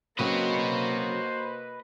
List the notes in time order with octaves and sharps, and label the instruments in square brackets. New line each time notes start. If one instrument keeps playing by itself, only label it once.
[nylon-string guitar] C#3 F#3 C4 [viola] A#3 F#4 [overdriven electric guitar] B4 D#5 [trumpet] C5